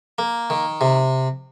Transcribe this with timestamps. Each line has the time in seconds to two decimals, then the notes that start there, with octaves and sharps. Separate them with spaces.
0.18 A#3
0.50 D#3
0.81 C3